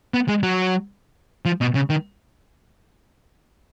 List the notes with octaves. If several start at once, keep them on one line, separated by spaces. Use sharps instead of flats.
B3
G#3
F#3
F3
B2
C#3
D#3